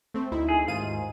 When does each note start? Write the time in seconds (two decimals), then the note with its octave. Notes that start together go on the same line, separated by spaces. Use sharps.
0.14 A3 C4
0.31 D2 D#4 E4
0.49 G#4
0.67 D#2 G#2 F4 D#7